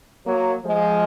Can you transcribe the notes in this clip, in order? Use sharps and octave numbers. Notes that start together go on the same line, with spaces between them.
F#3 A#3
F3 G#3